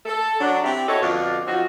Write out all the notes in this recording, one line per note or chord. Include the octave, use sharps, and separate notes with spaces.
A4
F#3 D4
C4 E4 G4
E4 F#4 A4 C#5 D#5
F2 B2 D3 D4 F4
F3 C4 D#4 F4 F#4